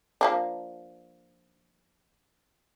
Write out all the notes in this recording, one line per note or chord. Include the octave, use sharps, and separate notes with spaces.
F3 A#3 D4